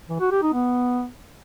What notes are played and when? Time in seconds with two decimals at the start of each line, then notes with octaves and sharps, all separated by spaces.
0.09 E3
0.20 F#4
0.31 G4
0.42 D#4
0.53 B3